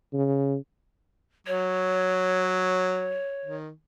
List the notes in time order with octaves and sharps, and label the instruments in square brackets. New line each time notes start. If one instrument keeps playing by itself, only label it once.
[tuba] C#3
[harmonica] F#3 [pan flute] C#5
[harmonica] D#3